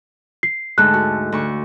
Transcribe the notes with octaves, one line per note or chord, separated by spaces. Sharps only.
C7
D2 G#2 A4 F#6
F#4
D2 C#6